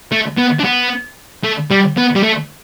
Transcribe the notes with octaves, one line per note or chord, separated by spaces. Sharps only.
A3
B3
D4
B3
A3
G3
B3
G3
A3